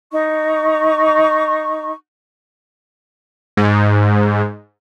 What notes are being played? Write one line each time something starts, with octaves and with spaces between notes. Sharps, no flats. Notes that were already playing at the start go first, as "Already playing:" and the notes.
D#4 C#6
G#2